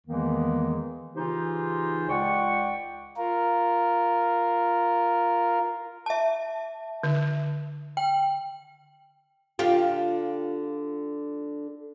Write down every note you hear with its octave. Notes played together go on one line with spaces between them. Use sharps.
E2 D#3 E3 G#3 A#3 B3
C#3 E3 D#4 F4 G4 C5
C#2 D5 F#5 G5 C#6
F4 A#4
E5 A5
D3
G5
D3 F4 G4